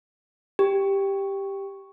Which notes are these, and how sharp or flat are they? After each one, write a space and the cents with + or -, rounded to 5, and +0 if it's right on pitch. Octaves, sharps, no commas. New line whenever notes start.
G4 +5